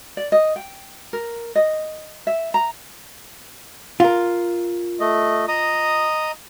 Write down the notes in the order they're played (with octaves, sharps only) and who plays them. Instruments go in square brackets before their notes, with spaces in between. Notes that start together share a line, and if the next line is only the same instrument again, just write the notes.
[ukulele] D5
D#5
G5
A#4
D#5
E5
A#5
[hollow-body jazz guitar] F4 A#4
[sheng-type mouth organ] A3 D#5
D#5 A#5 D#6